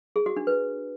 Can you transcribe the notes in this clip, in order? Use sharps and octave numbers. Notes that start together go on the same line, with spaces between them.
G#4
F#4
D4
B4